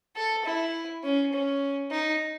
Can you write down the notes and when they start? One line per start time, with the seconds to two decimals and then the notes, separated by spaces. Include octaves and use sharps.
0.16 A4
0.45 E4
1.04 C#4
1.33 C#4
1.91 D#4